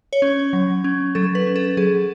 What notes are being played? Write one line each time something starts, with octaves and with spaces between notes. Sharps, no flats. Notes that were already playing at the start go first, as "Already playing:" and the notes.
C#5
C#4
F#3
C#4
F#3 A4
B4
C#4
A4
F#3 G#4